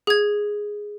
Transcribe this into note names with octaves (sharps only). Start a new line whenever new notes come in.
G#4 G#6